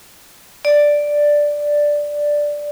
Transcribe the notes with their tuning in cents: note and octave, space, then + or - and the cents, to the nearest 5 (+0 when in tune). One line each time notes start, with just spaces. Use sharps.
D5 +0